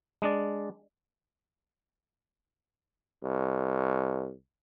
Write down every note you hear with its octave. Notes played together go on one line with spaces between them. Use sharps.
G#3 D4 D5
C2